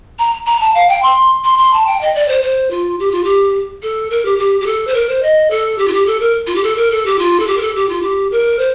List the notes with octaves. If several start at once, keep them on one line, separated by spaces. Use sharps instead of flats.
A#5
A#5
A5
F5
G5
C6
C6
C6
A5
G5
D#5
D5
C5
C5
F4
G4
F4
G4
A4
A#4
G4
G4
G4
A4
C5
A#4
C5
D#5
A4
G4
F4
G4
A4
A#4
F4
G4
A4
A#4
A4
G4
F4
A4
G4
A#4
A4
G4
F4
G4
A#4
C5